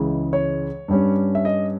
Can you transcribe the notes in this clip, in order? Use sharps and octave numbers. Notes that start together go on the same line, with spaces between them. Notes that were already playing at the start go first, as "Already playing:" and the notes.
Already playing: C#2 C#3 E3 G#3
C#5
G2 G3 C#4
E5
D#5